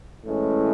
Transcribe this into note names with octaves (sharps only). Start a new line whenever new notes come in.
A2 E3 G#3 C#4